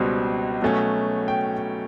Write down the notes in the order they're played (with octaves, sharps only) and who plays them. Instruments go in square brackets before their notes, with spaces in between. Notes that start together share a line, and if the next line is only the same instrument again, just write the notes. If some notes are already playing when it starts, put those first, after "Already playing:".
Already playing: [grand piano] C#2 B2 G3 C4
B2 F#3 A3 C#4
G5